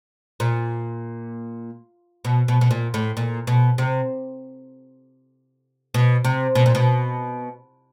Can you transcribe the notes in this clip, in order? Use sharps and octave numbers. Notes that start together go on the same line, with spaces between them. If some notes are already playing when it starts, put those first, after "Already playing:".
A#2
B2
B2
B2
A#2
A2
A#2
B2
C3
B2
C3
B2
A#2
B2